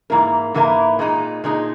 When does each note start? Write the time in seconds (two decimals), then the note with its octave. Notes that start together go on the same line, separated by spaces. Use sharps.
0.10 G#2 E3 A#3 E4 A#4
0.54 G#2 E3 A#3 E4 A#4
0.99 A#2 G#3 D#4
1.44 A#2 G#3 D#4